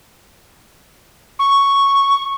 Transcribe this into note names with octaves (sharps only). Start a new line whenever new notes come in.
C#6